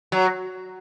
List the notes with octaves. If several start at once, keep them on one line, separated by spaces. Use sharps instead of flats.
F#3